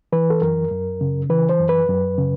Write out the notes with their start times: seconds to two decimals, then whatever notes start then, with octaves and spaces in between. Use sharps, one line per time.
0.12 E3 B4
0.30 A4
0.42 F#2 A#4
0.71 F#2
1.01 C#3
1.30 E3 B4
1.49 C5
1.59 F#2
1.69 B4
1.89 F#2
2.18 C#3